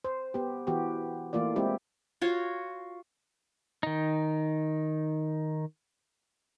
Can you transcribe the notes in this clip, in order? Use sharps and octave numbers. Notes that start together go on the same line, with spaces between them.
C5
B3 G4
E3 B3 F#4 G4
E3 A3 A#3 F4 D5
G#3 C4 E4 G4
F4 F#4 C#5
D#3 D#4